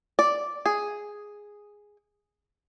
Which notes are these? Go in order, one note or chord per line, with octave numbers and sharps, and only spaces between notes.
D5
G#4